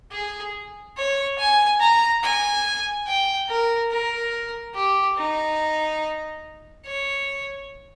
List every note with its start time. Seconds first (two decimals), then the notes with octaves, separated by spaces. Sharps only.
0.12 G#4
0.97 C#5
1.38 G#5
1.80 A#5
2.23 G#5
3.07 G5
3.49 A#4
3.91 A#4
4.75 G4
5.17 D#4
6.86 C#5